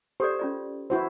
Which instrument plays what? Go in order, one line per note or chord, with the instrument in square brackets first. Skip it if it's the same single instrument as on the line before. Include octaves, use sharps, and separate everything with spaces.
[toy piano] G4 A4 D5 [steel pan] C5
[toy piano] C#4 F4 D5
[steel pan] E4 F#4 C5